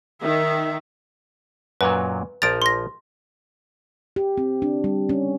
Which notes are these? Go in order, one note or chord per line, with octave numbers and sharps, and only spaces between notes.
D#3 E5
F#2 A#2 F#3 B4
A#1 F3 A#5 A6 D7
C6 A#6
G4
C4
D4
G3
C#4